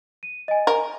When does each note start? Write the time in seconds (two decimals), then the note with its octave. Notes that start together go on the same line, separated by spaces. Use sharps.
0.23 D#7
0.48 D#5 G#5
0.67 A#4